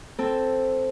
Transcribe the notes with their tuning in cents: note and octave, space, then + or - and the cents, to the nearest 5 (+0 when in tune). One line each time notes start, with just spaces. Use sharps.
C4 +0 A4 +0